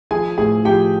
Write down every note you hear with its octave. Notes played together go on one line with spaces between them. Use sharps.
F3 G#4 G#5
A2 G#4 G#5
F3 G4 G5